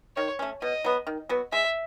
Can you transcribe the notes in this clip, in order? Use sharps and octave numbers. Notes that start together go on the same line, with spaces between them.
D#3 C#5
A3 C#4
B2 D#5
F#3 B3
D#3
F#3 B3 F#4
G#3 E5